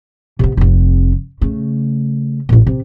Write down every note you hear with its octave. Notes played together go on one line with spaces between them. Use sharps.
C3 B3
F1 C3
C#3 A3
A1 A#2
C3